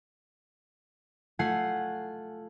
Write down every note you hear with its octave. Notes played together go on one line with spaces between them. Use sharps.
A3 F4 F#5 G#5 C7